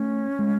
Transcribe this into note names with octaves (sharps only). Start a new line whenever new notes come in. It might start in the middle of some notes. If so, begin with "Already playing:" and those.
Already playing: A3 C#4
G#3